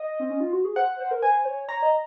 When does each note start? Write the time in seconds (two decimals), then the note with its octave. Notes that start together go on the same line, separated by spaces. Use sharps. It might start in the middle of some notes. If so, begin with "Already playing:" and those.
Already playing: D#5
0.19 C4
0.30 C#4
0.40 F4
0.53 F#4
0.65 G#4
0.76 C5 F#5
1.00 C5
1.11 A#4
1.22 C5 G#5
1.45 C#5
1.68 C#5 A#5
1.82 D#5